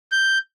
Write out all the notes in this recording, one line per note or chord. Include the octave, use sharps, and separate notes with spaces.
G6